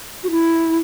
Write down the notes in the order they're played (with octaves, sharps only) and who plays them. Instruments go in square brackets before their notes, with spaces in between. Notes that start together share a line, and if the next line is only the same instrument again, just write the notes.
[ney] F#4
E4